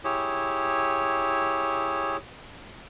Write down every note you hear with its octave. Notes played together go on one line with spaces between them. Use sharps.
E4 G4 G#4 C#5